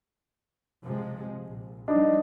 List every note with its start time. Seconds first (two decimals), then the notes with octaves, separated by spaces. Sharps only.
0.84 C3 F3 G#3
1.45 A#1
1.88 F3 G3 D4 D#4